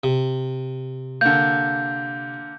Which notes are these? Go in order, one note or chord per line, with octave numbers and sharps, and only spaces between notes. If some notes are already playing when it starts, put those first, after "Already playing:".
C3
D3 A#3 G6